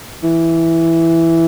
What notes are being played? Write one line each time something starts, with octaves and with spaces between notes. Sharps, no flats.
E3